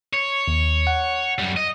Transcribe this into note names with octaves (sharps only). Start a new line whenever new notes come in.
C#5
D#2
F#5
F#2 G3
D#5